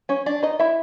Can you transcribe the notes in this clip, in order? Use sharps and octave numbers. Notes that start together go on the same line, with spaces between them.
C#4 C#5
D4 D5
D#4 D#5
E4 E5